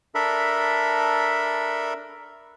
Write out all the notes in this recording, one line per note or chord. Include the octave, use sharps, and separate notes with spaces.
D4 A4 A#4 E5 B5